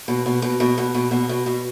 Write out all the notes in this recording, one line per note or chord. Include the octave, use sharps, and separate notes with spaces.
B2
B2
B2
B2
B2
B2
B2
B2
B2